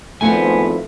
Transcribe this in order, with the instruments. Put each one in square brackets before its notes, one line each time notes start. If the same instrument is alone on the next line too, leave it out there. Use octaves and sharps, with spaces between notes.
[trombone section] G#1 F3 [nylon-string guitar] A3 E4 B4 [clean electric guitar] B3 G#5